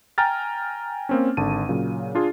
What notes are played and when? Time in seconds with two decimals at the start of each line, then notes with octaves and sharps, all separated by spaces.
0.18 G5 G#5 A#5 F6 A6
1.09 A#3 C4 C#4
1.37 G#1 D3 D4 A5 D#7
1.69 A#2 C#3 F#3
2.15 D4 F4 G#4